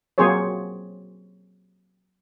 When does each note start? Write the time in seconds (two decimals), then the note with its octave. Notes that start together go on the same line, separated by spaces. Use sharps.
0.18 F#3 A#3 C4 G#4 C5 C#5